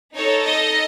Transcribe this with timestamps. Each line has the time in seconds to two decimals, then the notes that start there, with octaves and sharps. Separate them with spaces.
0.16 D#4 A4 C#5
0.45 D#5